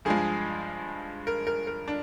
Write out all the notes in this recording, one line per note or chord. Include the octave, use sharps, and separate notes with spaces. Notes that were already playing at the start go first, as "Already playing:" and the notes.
G2 F3 G#3 G#4
A#4
A#4
A#4
D4